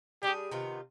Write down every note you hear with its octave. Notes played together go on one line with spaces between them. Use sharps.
G3 D4 G4 G#4
C3 D#3 B3 F4